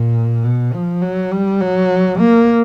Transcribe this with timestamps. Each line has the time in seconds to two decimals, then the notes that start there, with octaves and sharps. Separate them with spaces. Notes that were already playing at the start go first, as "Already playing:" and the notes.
Already playing: A#2
0.44 B2
0.73 F3
1.02 F#3
1.31 G3
1.61 F#3
2.19 A#3